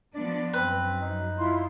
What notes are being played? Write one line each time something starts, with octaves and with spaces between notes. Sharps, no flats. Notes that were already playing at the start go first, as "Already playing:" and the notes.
F3 B3 D4 D5
F#2 C4 B4
D#4
E4 F4 C6